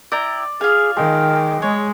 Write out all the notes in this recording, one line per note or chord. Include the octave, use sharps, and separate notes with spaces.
E4 D5 G5 A#5
F4 G#4 F5 G#5
D#3 G#3 G5
G#3 C#5